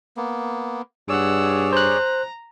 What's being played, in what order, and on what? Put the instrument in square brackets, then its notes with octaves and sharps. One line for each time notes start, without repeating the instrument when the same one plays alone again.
[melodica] A#3 B3
[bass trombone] G2 [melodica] G#4 C#5 D5 [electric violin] F#5 E6
[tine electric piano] C5 F#6 [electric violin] A#5